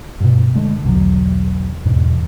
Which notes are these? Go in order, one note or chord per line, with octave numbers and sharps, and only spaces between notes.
G2 B2
D3 G#3 A3
B1 E2 D3 F#3
E2 G#2 B2 E3